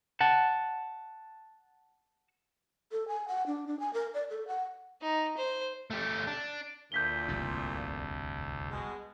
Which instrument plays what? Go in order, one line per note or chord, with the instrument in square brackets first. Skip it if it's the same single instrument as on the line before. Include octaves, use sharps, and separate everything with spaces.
[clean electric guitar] F#5 A5
[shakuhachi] A4
G#5
F#5
D4
D4
G#5
A#4
D5
A4
F#5
[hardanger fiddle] D#4
C5
[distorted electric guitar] A3 G4
D4
[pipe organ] D2 [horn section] A#2 [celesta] G6 B6 G7
[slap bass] F1 C2 G2
[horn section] B2 G#3